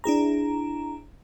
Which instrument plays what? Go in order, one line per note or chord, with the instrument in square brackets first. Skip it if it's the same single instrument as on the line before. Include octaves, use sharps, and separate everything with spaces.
[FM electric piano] D4 E4 G#4 A#5